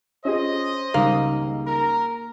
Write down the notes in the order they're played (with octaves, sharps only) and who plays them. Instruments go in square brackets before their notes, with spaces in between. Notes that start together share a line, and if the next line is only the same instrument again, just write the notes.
[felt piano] C#4 F4 G#4 [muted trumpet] C5 [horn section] D#5
[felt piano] C#2 D#3 G3 [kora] A#3
[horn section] A#4 [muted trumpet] A#5